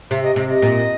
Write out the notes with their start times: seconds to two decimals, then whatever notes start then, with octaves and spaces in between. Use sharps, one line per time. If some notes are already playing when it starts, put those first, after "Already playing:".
0.11 C3 E5
0.23 D#5
0.36 C3 D#5
0.50 D#5
0.62 A#2